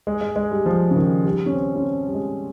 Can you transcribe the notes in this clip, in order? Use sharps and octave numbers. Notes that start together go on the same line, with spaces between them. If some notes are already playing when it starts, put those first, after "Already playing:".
G#3
G#3
G#3
G3
F3
C#3
D#3
G3
C#4
C4
C#4
C4
G3
G#3